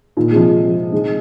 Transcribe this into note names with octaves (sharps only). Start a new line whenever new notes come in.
A#2 D#3
G#3
C3 F3
D#3 G#3